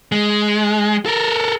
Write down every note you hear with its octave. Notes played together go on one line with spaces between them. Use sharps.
G#3
A4 A#4